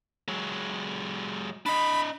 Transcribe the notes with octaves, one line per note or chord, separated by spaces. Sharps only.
F#3 G#3
D4 D#5 B5